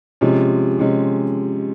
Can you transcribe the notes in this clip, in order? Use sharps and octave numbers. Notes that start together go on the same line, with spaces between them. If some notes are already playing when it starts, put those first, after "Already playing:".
C3 F3 G#3 C#4
C3 F3 G#3 C#4